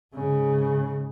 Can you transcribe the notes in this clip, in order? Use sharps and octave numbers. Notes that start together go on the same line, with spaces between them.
G#2 C#3